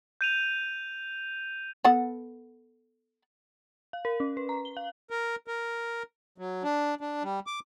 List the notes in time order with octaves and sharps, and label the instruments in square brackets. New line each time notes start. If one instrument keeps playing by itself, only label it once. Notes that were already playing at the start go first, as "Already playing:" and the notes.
[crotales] G6 D#7 F7
[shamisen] B3 A4 F#5
[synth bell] F5
A#4
C#4
B4
A#5
G7
F5
[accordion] A#4
A#4
F#3
D4
D4
G3
D6